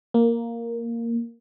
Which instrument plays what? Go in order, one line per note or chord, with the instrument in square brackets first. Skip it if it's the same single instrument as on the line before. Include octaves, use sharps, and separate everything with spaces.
[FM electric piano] A#3